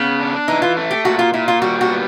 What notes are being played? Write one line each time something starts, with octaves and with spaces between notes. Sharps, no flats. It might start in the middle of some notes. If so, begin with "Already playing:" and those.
Already playing: C#3 B3
D4
E3 D#4
F4
A3
G4
A#2 F#4
F4
A#2 E4
F4
G3 F#4
F#4
B3